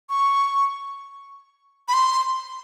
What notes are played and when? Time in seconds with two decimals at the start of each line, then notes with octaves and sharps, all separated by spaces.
0.09 C#6
1.88 B5
1.93 C6